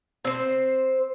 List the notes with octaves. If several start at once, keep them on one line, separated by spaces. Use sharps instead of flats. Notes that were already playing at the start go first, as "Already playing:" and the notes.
C4 C5